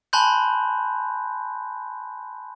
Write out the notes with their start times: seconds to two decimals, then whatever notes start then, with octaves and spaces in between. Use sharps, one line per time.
0.13 G#5 A5 B5 C6 F#6 G6